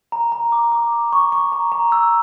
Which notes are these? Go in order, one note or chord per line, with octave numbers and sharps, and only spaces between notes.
A#5
A#5
D6
D6
A#5
C#6
C#6
A#5
A#5
E6